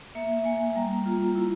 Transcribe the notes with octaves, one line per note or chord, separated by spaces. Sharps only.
A#3 E5
A#3 G#5
G3 A#5
F4
E4